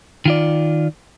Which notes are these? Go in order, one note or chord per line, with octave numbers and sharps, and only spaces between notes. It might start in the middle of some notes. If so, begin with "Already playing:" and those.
D#3 F4 D5